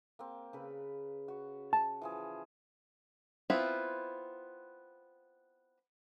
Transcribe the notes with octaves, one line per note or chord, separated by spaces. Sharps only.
A#3 C4
C#3 B4
F#4
A5
E3 F3 G#4
B3 C4 E4 F4